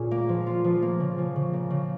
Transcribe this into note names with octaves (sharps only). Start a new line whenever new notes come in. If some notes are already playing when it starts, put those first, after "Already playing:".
Already playing: A#2 C#4 G#4
A#3
F3
F4
F3
A#3
C#3
F3
C#3
A#3
C#3